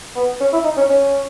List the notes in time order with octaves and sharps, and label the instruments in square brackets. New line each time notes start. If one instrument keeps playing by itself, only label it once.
[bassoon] B3
C#4
E4
D#4
C#4
C#4